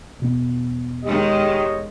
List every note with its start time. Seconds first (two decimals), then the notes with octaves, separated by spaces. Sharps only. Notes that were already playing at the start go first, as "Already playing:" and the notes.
0.20 E1 B2 B3
1.04 D#3 G#3 G4 C#5 D#5